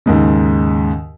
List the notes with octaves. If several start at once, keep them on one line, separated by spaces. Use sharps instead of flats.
D#2 G#2 C#3